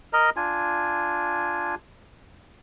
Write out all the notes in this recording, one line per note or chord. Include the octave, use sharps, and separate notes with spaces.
A#4 D#5 A#5
D4 F4 G#5